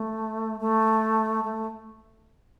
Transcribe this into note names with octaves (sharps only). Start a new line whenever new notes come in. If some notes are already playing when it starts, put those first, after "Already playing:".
Already playing: A3
A3
A3